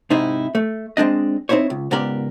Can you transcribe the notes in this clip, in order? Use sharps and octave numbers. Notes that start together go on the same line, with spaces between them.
G#2 C3 D#4 E4
A3
G#3 C4 D4 D#5
C4 D#4 E4 C5 C#5
C#2
C#2 G#2 B3 G4 A#4 D5